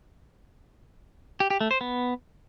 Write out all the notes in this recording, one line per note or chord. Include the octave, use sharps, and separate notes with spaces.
G4
G4
A3
C5
B3